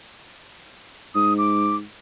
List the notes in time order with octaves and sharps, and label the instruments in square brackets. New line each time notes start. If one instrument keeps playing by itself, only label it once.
[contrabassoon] G#2 [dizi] D#6
[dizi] D6